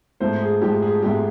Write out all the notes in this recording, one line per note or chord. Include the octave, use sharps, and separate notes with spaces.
G#2 F3 A3 C5
G#4
G#2 F3 A3 G4
G#4
G#2 F3 A3 G4